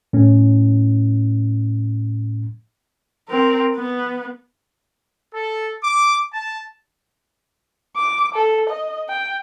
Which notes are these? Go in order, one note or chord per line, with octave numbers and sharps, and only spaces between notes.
A2 C#4
C4 A#4
B3
A4
D6
A5
D6
A4
D#5
G5